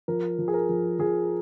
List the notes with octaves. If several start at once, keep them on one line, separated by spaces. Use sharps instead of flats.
F3 A#4
F3
G#4
A#4
F3
F3 G#4